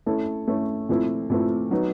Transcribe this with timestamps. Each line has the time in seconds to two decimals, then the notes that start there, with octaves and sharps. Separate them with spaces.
0.06 A3 C#4 E4 A4
0.47 A3 C#4 E4 A4
0.89 A#2 F3 A3 C4 E4
1.30 A#2 F3 A3 C4 E4
1.71 F#3 B3 D#4